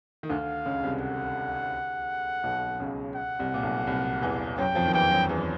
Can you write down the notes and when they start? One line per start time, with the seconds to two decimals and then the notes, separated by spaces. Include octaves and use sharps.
0.23 D#3
0.30 D2 D3 F5
0.66 C#2 C#3
0.83 C2 C3
1.01 F#5
2.43 B1 B2
2.80 C#2 C#3
3.15 F#5
3.39 C2 C3
3.54 A#2
3.63 B1 B2
3.87 C2 C3
4.22 E2 E3
4.58 F#2 F#3 G5
4.75 F2 F3
4.86 D#3
4.94 E2 E3 G5
5.11 F#2 F#3
5.29 E2 E3